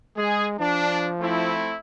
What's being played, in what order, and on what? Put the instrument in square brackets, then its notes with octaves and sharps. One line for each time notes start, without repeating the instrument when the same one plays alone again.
[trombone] G#3 [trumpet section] G#4
[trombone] F3 [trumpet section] D4
[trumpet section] A3 C4 E4